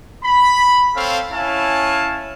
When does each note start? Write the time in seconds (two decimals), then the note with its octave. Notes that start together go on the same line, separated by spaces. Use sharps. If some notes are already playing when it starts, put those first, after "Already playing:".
0.25 B5
0.96 C4 A4 C#5 F5
1.33 C#4 E4 C#5 F5 G#5 A5